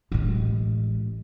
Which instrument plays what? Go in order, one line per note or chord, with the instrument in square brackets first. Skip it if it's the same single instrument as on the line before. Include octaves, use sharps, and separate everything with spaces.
[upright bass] A1 G#3